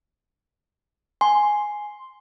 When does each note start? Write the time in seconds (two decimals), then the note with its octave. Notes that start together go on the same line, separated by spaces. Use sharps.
1.21 G#5 C6